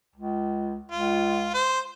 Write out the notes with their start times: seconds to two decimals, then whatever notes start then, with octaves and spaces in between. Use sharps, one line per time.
0.15 C#2
0.92 C#2 F4
1.54 C5